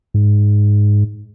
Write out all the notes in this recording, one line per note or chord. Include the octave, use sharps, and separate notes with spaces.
G#2